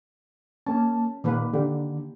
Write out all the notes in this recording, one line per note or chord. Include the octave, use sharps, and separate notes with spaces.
A#3 C#4 A5
A#2 D#3 A#3 B4
D3 G4